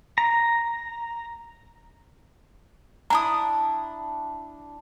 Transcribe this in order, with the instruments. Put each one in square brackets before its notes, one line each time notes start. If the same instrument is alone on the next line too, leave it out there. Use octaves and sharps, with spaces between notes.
[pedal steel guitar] A#5
[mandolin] D4 E4 D#6 [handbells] A#5